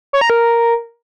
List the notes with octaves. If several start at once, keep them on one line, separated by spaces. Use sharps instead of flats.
C#5
A#5
A#4